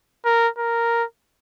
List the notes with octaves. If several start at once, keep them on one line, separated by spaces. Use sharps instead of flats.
A#4
A#4